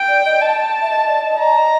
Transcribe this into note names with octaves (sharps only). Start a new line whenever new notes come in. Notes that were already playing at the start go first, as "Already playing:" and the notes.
Already playing: G5
D5
D#5
A5
E5
D#5
D5
D#5
D5 A#5
D#5